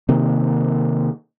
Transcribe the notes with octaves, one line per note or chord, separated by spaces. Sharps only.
C3 D#3 A#3